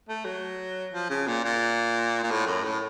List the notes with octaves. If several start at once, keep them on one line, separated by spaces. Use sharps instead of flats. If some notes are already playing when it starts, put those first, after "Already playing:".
A3
F#3
F3
C#3
A#2
A#2
A#2
A2
F#2
A2